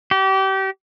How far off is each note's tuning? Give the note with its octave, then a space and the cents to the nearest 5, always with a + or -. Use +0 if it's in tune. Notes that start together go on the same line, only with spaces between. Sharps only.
G4 -30